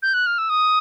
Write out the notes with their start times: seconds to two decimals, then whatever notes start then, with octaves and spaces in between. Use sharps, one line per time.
0.03 G6
0.14 F#6
0.26 F6
0.38 E6
0.49 D#6